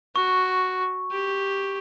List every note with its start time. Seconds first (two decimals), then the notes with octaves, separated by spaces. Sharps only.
0.15 F#4 C#6
1.11 G4